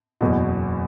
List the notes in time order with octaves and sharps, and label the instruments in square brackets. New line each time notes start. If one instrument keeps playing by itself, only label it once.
[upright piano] F#1 E2 B2